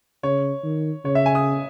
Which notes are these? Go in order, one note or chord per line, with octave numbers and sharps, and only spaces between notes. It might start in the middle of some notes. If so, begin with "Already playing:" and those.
C#3 C#5
D#3
C#3 C#5
E5
G#5
D#6